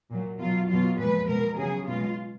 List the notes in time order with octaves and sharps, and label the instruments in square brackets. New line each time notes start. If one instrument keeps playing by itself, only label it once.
[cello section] A#2 F#3
B2 F#3 F4
B2 F#3 F4
A#2 F3 G#3 B4
B2 G#3 A#4
C#3 F#3 G#4
B2 G#3 F4